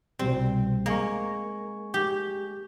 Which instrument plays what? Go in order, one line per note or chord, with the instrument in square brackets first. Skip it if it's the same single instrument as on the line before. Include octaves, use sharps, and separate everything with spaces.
[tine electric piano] C2 B2 G3 [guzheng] C4
[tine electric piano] G#3 G#5 C#6 [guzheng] A#3
[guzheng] G4